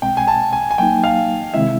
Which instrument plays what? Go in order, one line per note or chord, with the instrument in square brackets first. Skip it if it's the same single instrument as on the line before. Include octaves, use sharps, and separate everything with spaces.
[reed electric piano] B2 G#3 C4 [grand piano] G5
[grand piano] G#5
A5
G#5
G#5
[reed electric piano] F#3 A#3 D#4 [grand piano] G5
[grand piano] F5
[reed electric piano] C3 D#3 G#3 C4 E4 [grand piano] E5